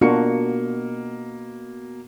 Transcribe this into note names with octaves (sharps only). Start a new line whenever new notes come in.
B2 A#3 D4 F4 F#4 C#7